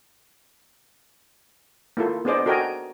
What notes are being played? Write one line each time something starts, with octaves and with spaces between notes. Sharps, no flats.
A#3 E4 F4 A4
B3 D4 G#4 C5 D5 D#5
F#4 A4 A#4 D#5 G5 G#5